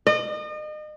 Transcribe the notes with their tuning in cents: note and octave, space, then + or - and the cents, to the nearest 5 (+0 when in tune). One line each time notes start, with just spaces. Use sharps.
D#5 -35